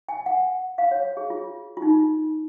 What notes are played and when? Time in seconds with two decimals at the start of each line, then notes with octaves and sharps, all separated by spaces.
0.09 G#5
0.26 F#5
0.78 F5
0.91 C#5
1.17 G#4
1.30 F4
1.77 F4
1.82 D#4